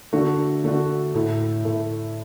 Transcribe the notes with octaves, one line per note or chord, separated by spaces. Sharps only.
D3 A3 D4 F#4
D3 A3 D4 F#4
A2 A3 E4
A2 A3 E4